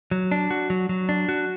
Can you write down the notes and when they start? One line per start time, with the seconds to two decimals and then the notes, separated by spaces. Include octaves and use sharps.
0.11 F#3
0.31 D4
0.51 F#4
0.70 F#3
0.89 F#3
1.09 D4
1.29 F#4